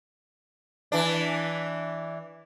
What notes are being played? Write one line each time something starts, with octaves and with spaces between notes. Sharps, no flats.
E3 D4